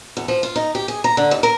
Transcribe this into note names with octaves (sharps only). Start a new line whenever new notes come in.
E2
F3
F4
D#4
G4
G#4
A#5
D3
D#2
A#4